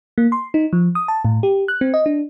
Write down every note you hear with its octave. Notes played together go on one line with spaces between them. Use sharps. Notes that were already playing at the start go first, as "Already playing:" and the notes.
A#3
C6
D#4
F3
D#6
A5
A2
G4
F#6
C4
D#5
D4